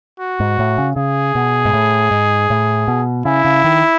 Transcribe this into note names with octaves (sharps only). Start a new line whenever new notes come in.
F#4
G#2
A2
C#3
C#3 G#4
B2
G#2
A2
G#2
A2
B2
C#3 E4
C#3
D#3